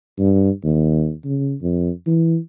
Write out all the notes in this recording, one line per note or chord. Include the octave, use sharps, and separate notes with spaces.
G2
D#2
C#3
F2
E3